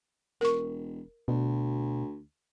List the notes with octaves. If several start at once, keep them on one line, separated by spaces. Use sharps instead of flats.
E1 A#4 C#6
D2 B2